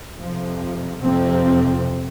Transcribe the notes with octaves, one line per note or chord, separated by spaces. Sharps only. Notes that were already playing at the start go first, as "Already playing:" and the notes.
F2 C3 F3
F2 C3 F3 C4